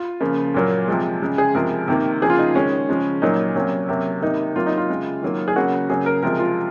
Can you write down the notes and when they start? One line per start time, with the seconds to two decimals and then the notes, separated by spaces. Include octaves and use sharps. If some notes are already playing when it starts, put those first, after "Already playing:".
Already playing: F4
0.20 C#3 F3 A#3
0.54 A#2 F#3 A#3
0.88 C3 F3 G#3
1.22 C#3 G#3
1.38 G#4
1.55 C3 F3 G#3 A#4
1.88 C3 D#3 A#3
2.21 C#3 F3 A#3 G#4
2.30 F4
2.38 D#4
2.55 D#3 G#3 C#4
2.89 C#3 F3 G#3
3.22 A#2 F#3 A#3 D#4
3.55 C3 F#3 A#3 C#4
3.89 C3 F#3 A#3
4.22 C3 D#3 A#3 D#4
4.56 C3 F#3 A#3 F4
4.66 D#4
4.78 F4
4.89 C#3 G#3
5.23 D#3 F#3 A#3
5.48 G#4
5.56 C#3 F#3 A#3 F#4
5.89 C#3 F#3 A#3 G#4
6.06 A#4
6.22 C3 F3 G#3 A#4
6.39 F4